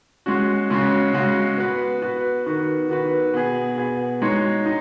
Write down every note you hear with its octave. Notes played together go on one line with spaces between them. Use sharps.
G#3 C#4 F#4
C#3 G#3 C#4 F#4
C#3 G#3 C#4 F#4
B3 F#4 B4
B3 F#4 B4
D#3 B3 F#4 B4
D#3 B3 F#4 B4
B2 B3 G#4
B2 B3 G#4
G#3 D#4 F#4 C#5
D#4